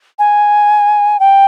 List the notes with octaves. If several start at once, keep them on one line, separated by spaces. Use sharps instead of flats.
G#5
G5